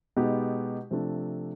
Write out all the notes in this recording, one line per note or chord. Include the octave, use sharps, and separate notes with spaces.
B2 G#3 B3 D#4 G4
C3 F3 A3 D4